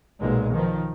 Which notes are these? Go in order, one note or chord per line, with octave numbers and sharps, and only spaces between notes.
B1 A#2 G#3
D#3 F3